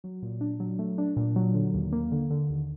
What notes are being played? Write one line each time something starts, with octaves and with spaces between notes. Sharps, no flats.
F#3
A#2
D4
F#3
A3
D4
A#2
F#3
D3
D#2
A#3
D3
D3
D#2